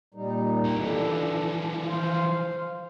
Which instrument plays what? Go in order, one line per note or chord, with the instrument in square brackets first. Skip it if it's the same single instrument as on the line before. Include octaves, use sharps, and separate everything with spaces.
[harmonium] A#2 G3 D#4
[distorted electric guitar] C2 G4
[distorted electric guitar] E3 F3 [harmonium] D4 A4
[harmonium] C5 F5